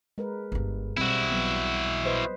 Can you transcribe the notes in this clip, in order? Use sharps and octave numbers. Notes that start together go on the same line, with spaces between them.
G#3 A#4 B4
G1 G2
B1 G3 C4 E4 F#4
F#3 B3
B4 C5 D#5